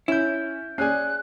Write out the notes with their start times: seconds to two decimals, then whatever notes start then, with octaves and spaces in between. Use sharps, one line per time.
0.08 C#4 E4 G6
0.78 C#4 G#4 D5 G#5 F#6 C7